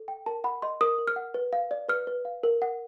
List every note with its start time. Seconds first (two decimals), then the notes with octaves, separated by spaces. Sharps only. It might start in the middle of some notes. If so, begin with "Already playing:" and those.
Already playing: A4
0.08 G5
0.26 A#4 A5
0.44 F#5 B5
0.62 D#5 C6
0.81 A#4 D#6
0.98 A#4
1.07 F6
1.16 F#5
1.34 B4
1.53 F5
1.71 D5
1.89 B4 F6
2.07 B4
2.25 F5
2.43 A#4
2.62 F#5